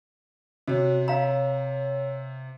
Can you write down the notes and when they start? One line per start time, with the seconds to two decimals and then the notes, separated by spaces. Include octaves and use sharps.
0.68 C3 F#4 C#5
1.08 C#5 F5 A#5